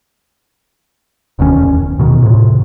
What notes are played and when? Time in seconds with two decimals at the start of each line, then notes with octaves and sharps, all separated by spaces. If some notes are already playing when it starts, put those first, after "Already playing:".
1.39 E1 D2 D#3 C#4
1.62 E2
1.99 B2 D#3
2.23 A2 C3